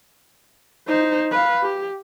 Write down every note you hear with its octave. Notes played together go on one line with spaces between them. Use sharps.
D#4 C5
B4 F5
G4